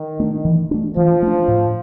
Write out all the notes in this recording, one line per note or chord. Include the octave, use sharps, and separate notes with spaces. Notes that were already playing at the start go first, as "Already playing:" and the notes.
Already playing: D#3
A3 D4
E3
A3 D4
E3 F3
A3 D4
A2